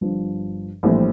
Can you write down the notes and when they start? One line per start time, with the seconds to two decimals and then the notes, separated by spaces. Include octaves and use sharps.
0.01 G1 G2 F3
0.83 A#1 A2 E3 G3 C4